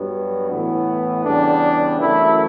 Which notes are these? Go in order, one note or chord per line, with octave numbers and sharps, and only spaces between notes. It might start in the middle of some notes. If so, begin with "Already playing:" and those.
Already playing: G2 F#3 B3
A2 E3 B3
E2 C#3 G3 B3 D4
F#2 E3 A3 E4